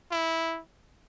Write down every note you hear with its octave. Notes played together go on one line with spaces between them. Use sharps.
E4